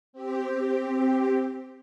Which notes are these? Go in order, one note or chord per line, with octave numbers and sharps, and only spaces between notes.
C4 G4